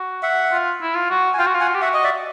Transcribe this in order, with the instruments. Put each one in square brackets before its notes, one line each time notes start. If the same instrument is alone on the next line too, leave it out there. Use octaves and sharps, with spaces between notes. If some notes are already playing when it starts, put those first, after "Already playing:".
Already playing: [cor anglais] F#4
[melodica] E5 F#5
[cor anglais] F4
E4
F4
F#4
[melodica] G#5
[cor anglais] F4 [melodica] F5 G5
[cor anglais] F#4
F4
[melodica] F#5 G#5
[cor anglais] G4
[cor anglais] F#4 [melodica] E5 F#5
[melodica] D#5
D5 E5